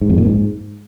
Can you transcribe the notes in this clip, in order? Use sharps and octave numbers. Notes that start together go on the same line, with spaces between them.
G#2
F2
A#2
G#2